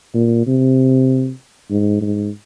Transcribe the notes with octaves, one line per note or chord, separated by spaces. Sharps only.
A#2
C3
G#2
G#2